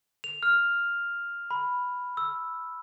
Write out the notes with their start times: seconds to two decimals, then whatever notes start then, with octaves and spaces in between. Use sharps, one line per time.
0.24 F7
0.43 F6
1.51 B5
2.17 E6